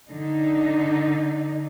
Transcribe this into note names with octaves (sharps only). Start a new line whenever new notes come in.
D3 D#4